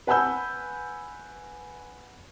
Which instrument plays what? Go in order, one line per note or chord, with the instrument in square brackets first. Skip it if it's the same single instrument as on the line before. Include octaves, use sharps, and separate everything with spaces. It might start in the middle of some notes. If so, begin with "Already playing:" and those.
[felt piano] B4 F#5 G#5 B5 E6 G6